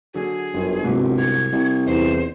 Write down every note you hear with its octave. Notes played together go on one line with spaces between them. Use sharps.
D3 F#3 G#4
G1 F#2
C2 G#2 C3 F#3
G#6
C2
E2 D#4 C5